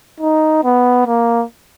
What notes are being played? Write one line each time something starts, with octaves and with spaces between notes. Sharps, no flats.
D#4
B3
A#3